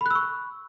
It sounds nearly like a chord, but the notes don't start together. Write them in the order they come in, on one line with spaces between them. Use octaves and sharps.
B5 F#6 E6 C#6